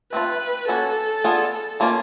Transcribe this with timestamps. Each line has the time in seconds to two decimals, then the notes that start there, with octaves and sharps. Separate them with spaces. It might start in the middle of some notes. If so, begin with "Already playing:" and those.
0.12 A3 C4 F4 B4
0.68 A#3 C#4 F#4 A4
1.24 B3 D4 F4 G#4
1.80 F3 A#3 C#4 F4